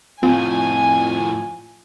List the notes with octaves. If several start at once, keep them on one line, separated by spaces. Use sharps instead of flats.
F2 A2 C4 F4 G#5